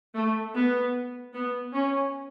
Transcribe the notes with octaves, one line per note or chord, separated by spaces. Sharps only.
A3
B3
B3
C#4